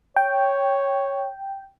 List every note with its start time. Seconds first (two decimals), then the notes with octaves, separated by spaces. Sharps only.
0.16 C#5 G5